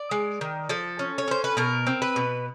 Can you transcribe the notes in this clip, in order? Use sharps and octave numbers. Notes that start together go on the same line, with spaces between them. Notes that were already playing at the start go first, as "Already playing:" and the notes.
Already playing: D5
G#3
D#3
F3 A4
C#4
C#5
C#4 C5
B4
B2 A#4
C4
B4
B2